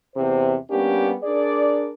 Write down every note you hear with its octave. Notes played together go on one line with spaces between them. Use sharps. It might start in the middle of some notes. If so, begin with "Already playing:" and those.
E2 C3 C5
G3 A#3 B3 C#4 D4 G4
D4 G#4 A#4 D5